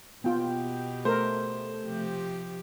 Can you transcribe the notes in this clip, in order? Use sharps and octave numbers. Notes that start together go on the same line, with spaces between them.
B2 B3 F4 G4 G5
A3 A4 A#4 C5
C3 F3 G4